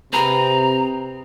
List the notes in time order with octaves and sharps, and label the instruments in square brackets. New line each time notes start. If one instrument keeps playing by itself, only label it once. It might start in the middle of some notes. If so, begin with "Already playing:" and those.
[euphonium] C3 [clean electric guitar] C4 G#4 B4 [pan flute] A#5